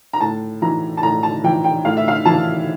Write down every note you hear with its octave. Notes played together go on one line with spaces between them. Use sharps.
A#5
A2 A5
E3 A#5
A5
A2 A#5
A5
E3 G5
G5
A2 F5
E5
F5
E3 A5